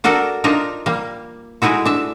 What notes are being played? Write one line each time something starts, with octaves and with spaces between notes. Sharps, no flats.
D4 F#4 A4 A#4 D5
D4 D#4 F4 A#4
G3 A#3
G#3 A3 D#4 E4 F#4
D4 E5